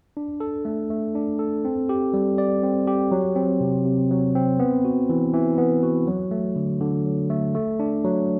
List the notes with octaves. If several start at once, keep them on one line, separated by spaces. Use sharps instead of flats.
D4
A4
A3
A3
D4
A4
C4
G4
G3
D5
C4
G4
F#3
C4
C3
C3
F#3
C4
B3
F#4
E3
E3
B3
F#4
F#3
A3
D3
D3
F#3
A3
A3
D4
F#3